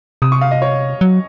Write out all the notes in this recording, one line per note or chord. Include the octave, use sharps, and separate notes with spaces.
C3 D#6
C#6
F5
D#5
C#5
F#3